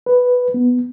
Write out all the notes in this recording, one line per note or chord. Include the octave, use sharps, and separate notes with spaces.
B4
B3